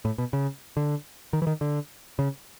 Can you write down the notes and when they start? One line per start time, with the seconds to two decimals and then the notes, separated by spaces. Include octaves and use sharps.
0.05 A2
0.18 B2
0.33 C#3
0.77 D3
1.33 D#3
1.42 E3
1.47 D#3
1.61 D3
2.19 C#3